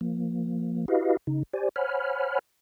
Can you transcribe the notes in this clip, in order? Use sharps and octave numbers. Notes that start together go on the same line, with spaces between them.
F3 A#3
E4 F#4 G4 B4 D#5 F5
C#3 D#4
G4 C5 D5 G#5
C5 C#5 F#5 G#5 B5 F6